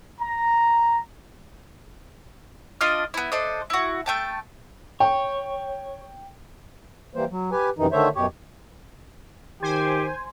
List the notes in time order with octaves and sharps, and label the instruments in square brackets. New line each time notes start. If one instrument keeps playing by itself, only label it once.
[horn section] A#5
[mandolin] D4 F4 D#5 F6
B3 E4
D4 A4 C5 D#5
E4 F#4
A3 G5 A5
[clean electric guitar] C#5 [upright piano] G5
[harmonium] E3 G3 A#3 C5
F#3
G4 B4 G#5
F#2 C3 D#3 E3 D#4
D3 D#3 A3 C5 C#5 E5
F#2 B2 G4 C#5
[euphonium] D#3 [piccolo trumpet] G4 [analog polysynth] C5 G#5